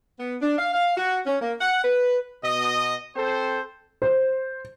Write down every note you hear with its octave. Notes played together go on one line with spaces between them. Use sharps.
B3
D4
F5
F5
F#4
C#4
A#3
F#5
B4
B2 D#5
C4 A4 C5
C5